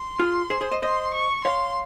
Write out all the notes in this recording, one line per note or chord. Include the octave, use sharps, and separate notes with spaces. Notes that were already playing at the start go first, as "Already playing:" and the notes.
Already playing: C6
F4 G#4
G#4 C5
G#4 C5
C5 D#5
C5 D#5 C6
C#6
C#5 F5 C6